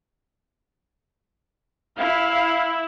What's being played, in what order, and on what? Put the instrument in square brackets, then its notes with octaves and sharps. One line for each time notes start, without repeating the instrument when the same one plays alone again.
[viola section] E4 [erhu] F5